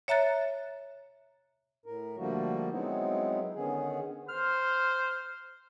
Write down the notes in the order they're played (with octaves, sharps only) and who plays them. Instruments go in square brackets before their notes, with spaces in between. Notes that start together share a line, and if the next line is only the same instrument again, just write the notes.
[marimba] C#5 E5 A#5 F#6 A6
[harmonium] A2 A#4
D3 F3 G3 A3 A#3 F#4
F#3 G#3 B3 C4 D#4 E4
D3 D#3 B3 C#4 G#4
[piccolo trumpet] C5 [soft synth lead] F6